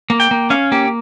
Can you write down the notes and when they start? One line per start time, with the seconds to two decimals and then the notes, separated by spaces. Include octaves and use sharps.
0.10 A#3
0.20 G5
0.31 A#3
0.50 C#4 F5
0.72 A#3 G4